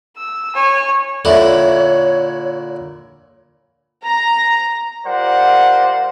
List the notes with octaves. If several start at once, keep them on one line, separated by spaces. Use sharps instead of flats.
E6
C#5 G#5
A#2 D3 E4 A4 C#5 E5
A#5
G3 F4 A#4 C5 D5 F#5